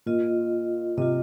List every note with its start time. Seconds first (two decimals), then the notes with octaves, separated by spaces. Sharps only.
0.06 A#2 F4 D#5
0.97 C3 F4 D#5